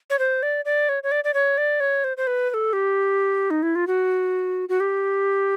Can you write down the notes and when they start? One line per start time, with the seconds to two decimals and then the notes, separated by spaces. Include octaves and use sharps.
0.10 C#5
0.19 C5
0.43 D5
0.65 D5
0.89 C#5
1.03 C#5
1.12 D5
1.24 D5
1.34 C#5
1.58 D5
1.80 C#5
2.04 C5
2.17 C5
2.27 B4
2.50 B4
2.54 A4
2.73 G4
3.50 D#4
3.63 E4
3.75 F4
3.87 F#4
4.69 F#4
4.80 G4